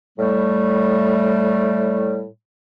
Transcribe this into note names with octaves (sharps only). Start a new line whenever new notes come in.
A2 G3 A3